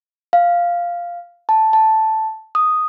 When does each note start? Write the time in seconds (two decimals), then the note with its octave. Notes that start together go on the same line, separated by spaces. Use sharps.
0.33 F5
1.49 A5
1.73 A5
2.55 D#6